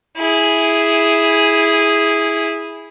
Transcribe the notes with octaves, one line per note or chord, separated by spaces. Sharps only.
E4 G#4